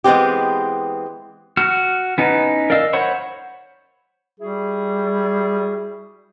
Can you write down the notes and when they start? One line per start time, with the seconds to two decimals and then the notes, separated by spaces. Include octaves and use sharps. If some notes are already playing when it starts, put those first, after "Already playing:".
0.04 E3 G#3 B3 C4 G4
1.57 F#4 F6
2.18 B3 C#4 D#4 E4 B4
2.70 A#4 D5 D#5 F5 E6
2.93 C5 C#5 F#5 B5 C#6
4.39 G3 E4 F#4 G#4